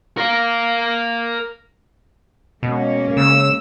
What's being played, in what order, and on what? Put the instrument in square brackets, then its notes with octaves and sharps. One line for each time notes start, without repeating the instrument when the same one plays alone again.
[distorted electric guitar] A#4 F5
[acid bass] B2 [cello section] G#3 A#3 C#4
[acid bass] C#3 [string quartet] E6